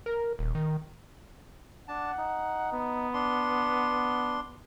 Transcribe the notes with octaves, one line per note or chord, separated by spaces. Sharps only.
A#4
D#1
D#3
D4 F#5 A5
D#4
B3
D4 C6